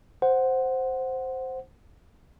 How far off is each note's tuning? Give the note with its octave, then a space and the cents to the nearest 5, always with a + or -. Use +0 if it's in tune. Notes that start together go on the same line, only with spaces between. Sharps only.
C5 +0 F#5 +0